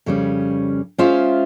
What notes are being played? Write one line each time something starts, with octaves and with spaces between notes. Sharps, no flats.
F2 C#3 G3 C#4
G#3 C#4 F4 C5 E5